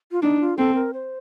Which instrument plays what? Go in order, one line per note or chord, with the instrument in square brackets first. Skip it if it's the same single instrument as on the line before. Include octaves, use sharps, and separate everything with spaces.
[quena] F4
[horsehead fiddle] D4 [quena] D#4
[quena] F4
[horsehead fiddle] C4 [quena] A4
[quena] A#4
C5